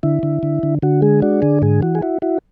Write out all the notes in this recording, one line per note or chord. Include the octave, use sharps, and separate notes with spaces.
D3 E4
D3
D3
D3
D3 F#4
G#3 G#4
D4 F#4
D3 G#4
G#2 G#4
E3 F#4
G#4
E4 F#4
E4 F#4